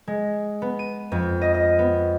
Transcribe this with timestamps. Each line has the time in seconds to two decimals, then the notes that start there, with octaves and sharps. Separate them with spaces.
0.07 G#3
0.62 B3
0.79 D#7
1.12 F2
1.42 D#5
1.54 D#5
1.79 B3